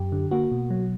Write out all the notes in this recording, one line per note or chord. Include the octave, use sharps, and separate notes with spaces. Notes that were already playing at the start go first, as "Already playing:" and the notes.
Already playing: F#2 G4
D3
A#3 F#4
B2
F#3